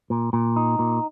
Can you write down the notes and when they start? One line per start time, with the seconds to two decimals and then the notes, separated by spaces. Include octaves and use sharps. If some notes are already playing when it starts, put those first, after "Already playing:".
0.10 A#2
0.33 A#2
0.56 D#4
0.79 A#2